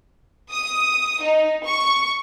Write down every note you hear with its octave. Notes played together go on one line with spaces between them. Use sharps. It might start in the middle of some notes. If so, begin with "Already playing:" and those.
D#6
D#4
C#6